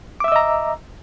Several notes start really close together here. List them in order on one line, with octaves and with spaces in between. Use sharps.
D6 E5 E6 D#5 A#5